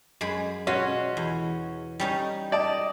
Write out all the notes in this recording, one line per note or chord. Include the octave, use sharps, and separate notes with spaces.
F#2 G#3 B5
B2 C#4 F4 F#4
E2
G3 C#4 D#4
D5 D#5 A5